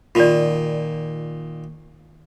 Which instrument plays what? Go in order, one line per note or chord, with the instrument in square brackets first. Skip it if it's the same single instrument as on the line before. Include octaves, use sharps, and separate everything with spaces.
[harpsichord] A#2 D#3 [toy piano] F4 D5